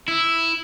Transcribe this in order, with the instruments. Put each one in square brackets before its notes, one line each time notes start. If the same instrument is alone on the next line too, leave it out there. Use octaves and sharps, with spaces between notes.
[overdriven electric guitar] E4